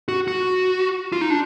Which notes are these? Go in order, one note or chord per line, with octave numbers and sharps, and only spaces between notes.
F#4
F#4
F4
D#4
D4